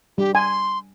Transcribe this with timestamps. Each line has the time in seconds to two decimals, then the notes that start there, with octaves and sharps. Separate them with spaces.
0.18 G3 G4
0.35 G#5 C6